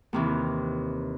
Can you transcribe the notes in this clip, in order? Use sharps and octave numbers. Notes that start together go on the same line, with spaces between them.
D#2 C3 E3